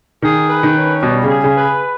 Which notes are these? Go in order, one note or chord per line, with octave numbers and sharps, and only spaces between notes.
D#3 G#4
B4
D#3
C#4
B2 G3
C#3
G#4
C#3
B4